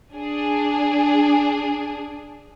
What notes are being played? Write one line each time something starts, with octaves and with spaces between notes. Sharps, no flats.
D4 G#4